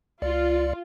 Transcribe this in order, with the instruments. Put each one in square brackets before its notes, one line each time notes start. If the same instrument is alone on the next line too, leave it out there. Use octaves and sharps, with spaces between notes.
[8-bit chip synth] C#2 D5 [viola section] F4